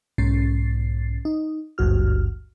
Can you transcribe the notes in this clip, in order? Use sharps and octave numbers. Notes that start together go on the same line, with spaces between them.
B1 G#2 C#4 A6 C7
D#4
G#1 D2 G2 F#4 F6